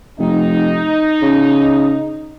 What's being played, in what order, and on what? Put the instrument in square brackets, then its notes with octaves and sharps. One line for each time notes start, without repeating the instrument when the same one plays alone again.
[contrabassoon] F1 [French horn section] D#4
[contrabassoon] C#3